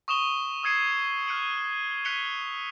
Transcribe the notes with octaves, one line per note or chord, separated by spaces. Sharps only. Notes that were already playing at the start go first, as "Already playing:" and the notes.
C#6 D#6 E7 F7 G7
D#6 E6 G#6 C7 C#7 D#7
F6 F#6 C#7 D#7 F#7
F#6 B6 C#7 D#7 F7 G7